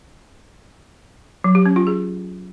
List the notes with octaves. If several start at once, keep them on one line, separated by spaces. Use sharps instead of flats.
F#3
G4
C#4
F4
G#4